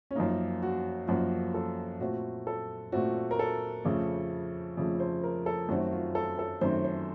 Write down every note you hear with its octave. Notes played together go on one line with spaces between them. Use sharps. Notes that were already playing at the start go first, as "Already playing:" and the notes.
C#4
F#2 F3 A#3 D#4
F#4
F#2 F3 A#3 F#4
A4
A#2 A3 C4 F#4
A4
A#2 A3 C4 F#4
A#4
A4
F2 C#3 A3
F2 C#3 A3
C5
A#4
A4
F#2 D#3 A3 C4 F#4
F4
A4
A4
F#2 D#3 A3 C4 C5
C5